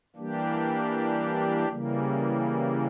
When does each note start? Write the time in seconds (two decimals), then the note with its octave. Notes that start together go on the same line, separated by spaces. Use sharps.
0.16 E3 G3 A#3 D4 G4
1.68 C#3 E3 G3 A#3